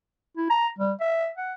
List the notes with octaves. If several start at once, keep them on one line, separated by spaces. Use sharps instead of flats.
E4
A#5
G3
E5
F#5